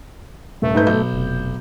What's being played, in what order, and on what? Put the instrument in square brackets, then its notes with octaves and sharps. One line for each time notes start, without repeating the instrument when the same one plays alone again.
[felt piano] D#1 [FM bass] A3
[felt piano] G#2 B4 G6
[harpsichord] B1 [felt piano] G6
[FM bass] F1